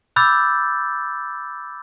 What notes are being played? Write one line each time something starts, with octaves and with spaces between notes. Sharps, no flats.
B5 D6 E6 F#6 G6 A6